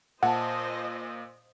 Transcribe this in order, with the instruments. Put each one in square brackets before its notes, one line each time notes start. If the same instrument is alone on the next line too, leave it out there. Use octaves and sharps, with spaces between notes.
[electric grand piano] A#2 [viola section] C5 D#5 [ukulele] E5 A5 [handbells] F#5